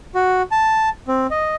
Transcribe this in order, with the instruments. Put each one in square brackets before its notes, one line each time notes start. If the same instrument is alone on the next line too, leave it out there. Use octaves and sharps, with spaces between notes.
[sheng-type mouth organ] F#4
A5
C4
D#5